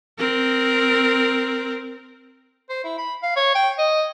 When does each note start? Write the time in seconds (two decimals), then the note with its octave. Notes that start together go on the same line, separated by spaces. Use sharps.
0.19 C4 A#4
2.70 C5
2.84 E4
2.98 B5
3.23 F5
3.37 C#5
3.55 G5
3.78 D#5